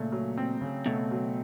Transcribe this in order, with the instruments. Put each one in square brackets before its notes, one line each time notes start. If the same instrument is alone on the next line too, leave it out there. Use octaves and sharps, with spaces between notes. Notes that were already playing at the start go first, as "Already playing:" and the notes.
Already playing: [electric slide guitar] A#2 [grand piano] C#3 A3
[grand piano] F#3
C4
C#3
[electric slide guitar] B2 [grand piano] A3
[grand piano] F#3